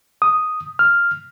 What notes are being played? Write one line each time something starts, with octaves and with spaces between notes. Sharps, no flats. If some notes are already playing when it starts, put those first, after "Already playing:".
D#6
F6